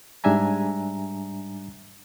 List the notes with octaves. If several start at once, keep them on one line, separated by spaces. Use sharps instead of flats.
G#2 G3 D4 E5 G#5 A#5